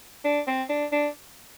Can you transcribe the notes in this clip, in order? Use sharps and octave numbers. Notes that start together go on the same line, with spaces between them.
D4
C4
D4
D4